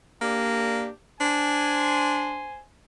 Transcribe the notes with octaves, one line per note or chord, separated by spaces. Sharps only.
A#3 D4 G4
D4 C5 G#5